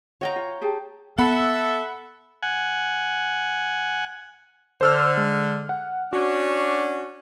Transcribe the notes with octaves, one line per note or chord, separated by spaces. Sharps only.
F4 C#5 D#5 F#5 G5 A#5
F4
G4 G#4 A5
B3 A4 E5 F#5 B5
F#5 G#5
D3 C5 E6 F6
G#3
F#5
C#4 D4 F#4